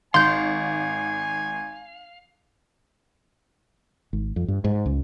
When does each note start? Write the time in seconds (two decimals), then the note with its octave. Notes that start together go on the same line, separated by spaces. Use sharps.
0.14 G#1 F5 G#5 C6 G6
4.13 G#1
4.36 F2
4.48 G2
4.64 G#2
4.86 C#2